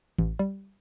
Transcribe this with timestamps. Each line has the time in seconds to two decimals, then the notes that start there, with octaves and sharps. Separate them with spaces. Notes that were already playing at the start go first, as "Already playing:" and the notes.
0.18 A1
0.39 G3